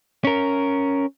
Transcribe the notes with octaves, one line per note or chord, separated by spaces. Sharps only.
C#4 A#4